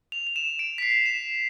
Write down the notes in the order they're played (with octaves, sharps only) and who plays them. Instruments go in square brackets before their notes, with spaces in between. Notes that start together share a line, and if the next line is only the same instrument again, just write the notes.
[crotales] F7
F7
E7
D7
B6
C7
E7